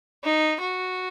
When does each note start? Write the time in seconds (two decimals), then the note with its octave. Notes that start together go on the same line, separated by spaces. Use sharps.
0.24 D#4
0.60 F#4